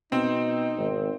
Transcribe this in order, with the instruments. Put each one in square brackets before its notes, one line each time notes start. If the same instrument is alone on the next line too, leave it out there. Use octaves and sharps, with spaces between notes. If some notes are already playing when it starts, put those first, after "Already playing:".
[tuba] B2 [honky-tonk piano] C4 [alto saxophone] D#4
[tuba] G#1